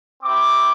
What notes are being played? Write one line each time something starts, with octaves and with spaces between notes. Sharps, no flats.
C4 E4 G4 D6